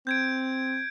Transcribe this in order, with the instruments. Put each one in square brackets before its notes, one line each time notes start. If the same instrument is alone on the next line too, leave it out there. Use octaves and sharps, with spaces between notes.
[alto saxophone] C4 [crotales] G6 G#6 D7